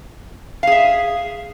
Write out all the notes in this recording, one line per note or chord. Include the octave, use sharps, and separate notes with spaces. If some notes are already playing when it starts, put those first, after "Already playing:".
G#4 E5 F5